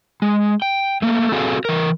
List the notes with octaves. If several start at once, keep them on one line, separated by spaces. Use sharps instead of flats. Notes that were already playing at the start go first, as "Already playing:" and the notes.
G#3
G5
A3 A#3
C4 F#4 G#4 A4 F5
E3 A#4